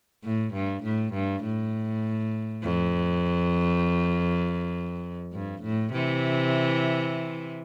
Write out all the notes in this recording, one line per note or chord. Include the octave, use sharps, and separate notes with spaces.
A2
G2
A2
G2
A2
F2
G2
A2
C3 E3